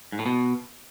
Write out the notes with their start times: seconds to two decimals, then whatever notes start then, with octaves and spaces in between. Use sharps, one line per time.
0.12 G#2
0.19 A2
0.26 B2